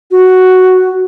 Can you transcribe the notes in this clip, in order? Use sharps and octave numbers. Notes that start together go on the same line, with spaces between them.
F#4